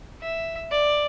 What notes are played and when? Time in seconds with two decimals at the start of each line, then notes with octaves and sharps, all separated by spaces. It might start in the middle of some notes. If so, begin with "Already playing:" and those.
0.22 E5
0.71 D5